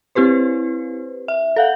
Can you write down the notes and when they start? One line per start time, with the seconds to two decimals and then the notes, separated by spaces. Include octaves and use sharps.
0.15 C4 E4 G4 B4 C5
1.28 E5
1.56 A4 F5 F#5